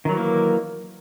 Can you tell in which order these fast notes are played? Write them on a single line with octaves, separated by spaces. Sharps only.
D#3 F#3 E3 A#3